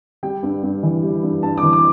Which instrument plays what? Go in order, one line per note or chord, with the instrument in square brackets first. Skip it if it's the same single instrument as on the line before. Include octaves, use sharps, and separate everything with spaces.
[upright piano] G3 G5
G2
G2
E3
G3
G2
G2 A5
D6
E3
D6